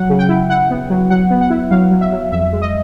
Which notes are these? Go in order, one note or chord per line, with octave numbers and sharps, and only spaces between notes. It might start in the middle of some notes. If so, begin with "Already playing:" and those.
Already playing: F#3 F#5
C#3
G5
E4
E4 F#5
B3
F#3
F#3 F#5
B3
F#5
E4
F#3 F5
F#3
E5
F#3
F2 E5
G#3
D#5